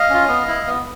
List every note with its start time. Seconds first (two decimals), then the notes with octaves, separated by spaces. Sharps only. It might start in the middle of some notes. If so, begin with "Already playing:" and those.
Already playing: D#5 F5
0.10 C#4 F4
0.28 B3
0.48 E4
0.66 B3